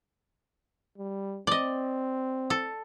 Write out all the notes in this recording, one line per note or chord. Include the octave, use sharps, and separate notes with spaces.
G3
C4 D5 D#5
A4